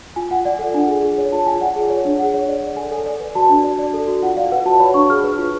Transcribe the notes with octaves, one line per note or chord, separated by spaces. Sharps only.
F4 G#5
F4 F#5
D5 F#5
A4 F#5
D4 G#5
G#4
G#4
C#5
F4 A5
F4 G#5
D5 F#5
G#4
C#5
D4
G#4 F#5
C#5
D5
D5
A4 G#5
A4 G#5
D5
B4
F#4 A5
D4
D5
D5
A4
F#4
F4 F#5
D5 F5
B4 F#5
F#4 A5
C#5 B5
D4 C#6
G#4 F6
B4
F4